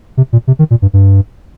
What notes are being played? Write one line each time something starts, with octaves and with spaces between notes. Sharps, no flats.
C3
A#2
C3
D#3
A#2
G2
G2